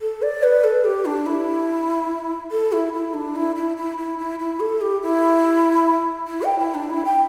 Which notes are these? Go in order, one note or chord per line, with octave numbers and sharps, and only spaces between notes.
A4
D5
B4
A4
G4
D4
E4
A4
E4
E4
D4
E4
E4
E4
E4
E4
E4
A4
G4
E4
E4
G5
E4
D4
E4
G5